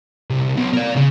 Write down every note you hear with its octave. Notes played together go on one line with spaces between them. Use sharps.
C2
B1 B2
A#4 D5
C#3